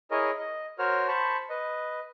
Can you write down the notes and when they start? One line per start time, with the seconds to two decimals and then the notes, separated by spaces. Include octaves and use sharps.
0.11 E4 G#4 A#4 C#5 D#5
0.38 D#5
0.79 F#4 A#4 C5 C#5 F6
1.08 C5 A5 B5 C#6
1.49 B4 D#5